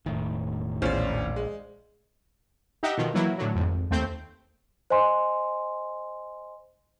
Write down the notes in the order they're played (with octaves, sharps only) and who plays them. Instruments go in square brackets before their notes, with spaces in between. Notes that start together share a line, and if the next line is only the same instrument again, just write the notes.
[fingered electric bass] E1 A2 D#3
[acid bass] A#1 [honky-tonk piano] E2 C#4 F4 [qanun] C5 D5
[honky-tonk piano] G#3
[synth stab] D#4 G4 D#5 E5 F#5
B2 D#3 F3
E3 F#3 A#3 E4
A2 D3 F#3
G#1 F2
D#2 A3 C4 G6
[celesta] C5 D#5 G#5 C6